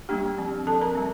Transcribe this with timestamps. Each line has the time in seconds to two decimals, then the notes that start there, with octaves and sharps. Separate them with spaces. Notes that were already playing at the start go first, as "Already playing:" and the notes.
0.09 G3 A#3 D4 G4 G5
0.38 F3 C4
0.67 F3 C4 A4 A5
0.81 A#4 A#5
0.95 G3 C4